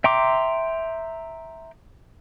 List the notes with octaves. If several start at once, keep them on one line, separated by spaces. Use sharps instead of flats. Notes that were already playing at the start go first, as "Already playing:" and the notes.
E5 G5 A#5 C6 D6